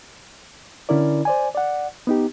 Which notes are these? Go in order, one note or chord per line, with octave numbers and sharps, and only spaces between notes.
D3 C#4 E4 A#4 D5
C5 D5 G#5
D5 F#5
B3 D#4 G4